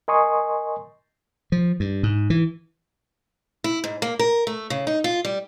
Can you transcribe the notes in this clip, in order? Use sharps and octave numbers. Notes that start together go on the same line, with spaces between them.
A#4 D#5 G#5 C6 C#6 D#6
F3
G2
G#2
E3
E4
G#2
A#3
A#4
A3
C#3
D#4
F4
G3